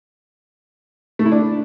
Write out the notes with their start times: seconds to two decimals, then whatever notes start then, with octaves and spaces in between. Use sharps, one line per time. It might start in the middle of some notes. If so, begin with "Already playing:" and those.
1.19 A3
1.25 E4
1.32 D4